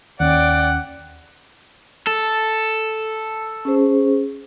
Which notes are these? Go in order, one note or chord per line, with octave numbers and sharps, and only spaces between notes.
D#2 C#4 D5 F#5 G5
A4
C#4 G#4 C5